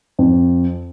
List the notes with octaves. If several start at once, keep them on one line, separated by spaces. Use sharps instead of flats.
F2